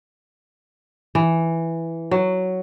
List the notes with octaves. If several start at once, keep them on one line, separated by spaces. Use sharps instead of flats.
E3
F#3